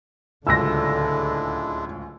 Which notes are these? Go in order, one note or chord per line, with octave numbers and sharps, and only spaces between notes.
D1 C#2 D3 G#3 D4 E4 E6 A#6